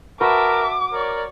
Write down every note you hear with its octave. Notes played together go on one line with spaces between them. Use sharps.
F#4 A#4 B4 E5 A5 D6
A#4 C#5 D5